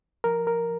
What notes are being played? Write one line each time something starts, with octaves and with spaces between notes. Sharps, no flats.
F3 A#4
A#4